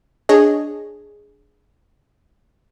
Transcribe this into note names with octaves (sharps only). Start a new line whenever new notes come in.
D4 G#4 C#5 D#5